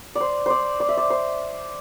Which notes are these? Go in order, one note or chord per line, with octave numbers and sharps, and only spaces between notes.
C5 D5
C5 D5
D5
E5
D5
C5